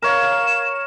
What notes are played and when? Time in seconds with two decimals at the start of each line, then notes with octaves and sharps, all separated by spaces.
0.02 A#4 C#5 F5 E7